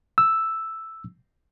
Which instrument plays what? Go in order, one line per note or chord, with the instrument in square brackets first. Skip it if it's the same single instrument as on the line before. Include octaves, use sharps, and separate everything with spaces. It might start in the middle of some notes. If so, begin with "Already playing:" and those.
[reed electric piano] E6